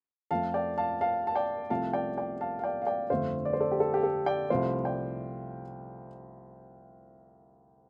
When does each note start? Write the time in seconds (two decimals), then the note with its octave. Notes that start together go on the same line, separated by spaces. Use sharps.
0.31 F2 F3 A3 F5 A5
0.54 D5 G5
0.78 F5 A5
1.01 F5 A5
1.27 A5
1.36 D5 G5
1.70 C2 C3 F3 A3 F5 A5
1.93 D5 G5
2.17 D5 G5
2.41 F5 A5
2.59 F5
2.64 D5 G5
2.82 F5
2.87 D5 G5
3.10 G1 F2 D3 A3 C5 F5
3.45 D5
3.53 C5
3.60 A4 D5
3.72 G4
3.80 A4
3.94 G4
4.03 A4
4.26 D5 G5
4.50 C2 C3 F3 A3 C5 F5
4.85 D5 G5